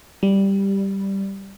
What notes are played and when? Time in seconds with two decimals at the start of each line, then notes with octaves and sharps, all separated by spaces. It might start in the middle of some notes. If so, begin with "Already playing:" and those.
0.23 G3